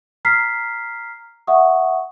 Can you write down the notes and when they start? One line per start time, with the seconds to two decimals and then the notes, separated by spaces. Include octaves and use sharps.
0.25 A#5 F6 B6 C7
1.47 E5 F#5 C#6 D#6